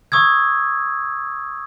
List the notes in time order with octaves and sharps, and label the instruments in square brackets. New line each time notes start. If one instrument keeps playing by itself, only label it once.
[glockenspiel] C#6 D#6 E6 G#6